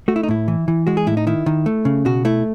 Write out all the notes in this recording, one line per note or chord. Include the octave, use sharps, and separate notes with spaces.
A3 F#4
E4
D#4
A2 E4
E3
E3
G#3 F#4
G#4
A2 E4
D#4
D#3 E4
D#3
A3
C#3
B2 F#4
A3 E4